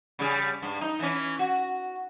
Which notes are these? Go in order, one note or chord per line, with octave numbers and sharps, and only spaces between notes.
C#3 G3 G#4
G2
D#4
E3 C#4
F#4